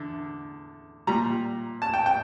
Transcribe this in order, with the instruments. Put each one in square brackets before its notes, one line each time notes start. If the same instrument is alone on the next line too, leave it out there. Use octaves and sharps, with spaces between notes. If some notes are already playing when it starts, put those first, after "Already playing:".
Already playing: [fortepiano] E2 D3
A#2 G3 A#5
A5
G5
G5